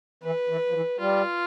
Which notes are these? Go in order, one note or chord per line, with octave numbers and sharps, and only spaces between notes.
E3 B4
E3
F3
E3
G3 F4